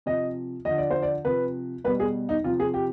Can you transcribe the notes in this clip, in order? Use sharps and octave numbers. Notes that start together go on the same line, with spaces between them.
C3 F3 D#5
D3 F3 D#5
D5
C5
D5
C3 F3 B4
B2 G3 B4
G#4
D#4
C3 F3 F4
G#4
G4